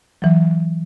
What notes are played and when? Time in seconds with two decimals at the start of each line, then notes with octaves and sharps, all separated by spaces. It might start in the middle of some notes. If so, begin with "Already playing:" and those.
0.22 E3 F#3